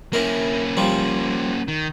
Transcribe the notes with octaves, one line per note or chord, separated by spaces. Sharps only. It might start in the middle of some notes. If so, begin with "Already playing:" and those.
A#3 C#4 E4 A#4
F3 G3
D#3